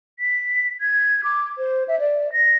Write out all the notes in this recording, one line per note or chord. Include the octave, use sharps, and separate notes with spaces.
B6
G#6
D6
C5
E5
D5
A#6